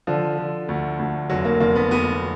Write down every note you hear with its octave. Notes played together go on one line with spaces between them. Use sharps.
D3 F3
D3
D2
D2
F1 F#3
A#3
F1 A#3
B3
F1 B3